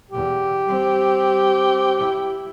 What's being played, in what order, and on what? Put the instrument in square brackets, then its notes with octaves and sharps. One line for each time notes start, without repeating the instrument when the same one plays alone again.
[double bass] E2 B2 [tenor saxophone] G4
[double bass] G3 C4
E4